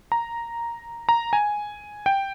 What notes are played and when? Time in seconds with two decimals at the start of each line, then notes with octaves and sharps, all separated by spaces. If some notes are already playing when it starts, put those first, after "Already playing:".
0.12 A#5
1.09 A#5
1.33 G#5
2.06 G5